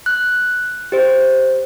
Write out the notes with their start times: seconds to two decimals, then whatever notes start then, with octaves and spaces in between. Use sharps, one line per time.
0.06 F#6
0.92 G4 C5